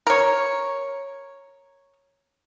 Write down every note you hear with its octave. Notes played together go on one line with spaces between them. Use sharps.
A#4 C#5